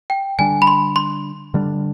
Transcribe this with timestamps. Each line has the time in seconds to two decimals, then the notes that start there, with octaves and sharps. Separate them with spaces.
0.10 G5
0.39 D3 G3 D4 G#5
0.62 B5
0.67 C6
0.96 C6
1.54 D3 G3 D4